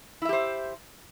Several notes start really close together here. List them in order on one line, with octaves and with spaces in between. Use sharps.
E4 E5 G4 C5